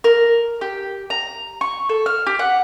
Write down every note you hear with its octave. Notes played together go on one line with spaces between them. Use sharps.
A#4
G4
A#5
C#6
A4
F6
G4
F#5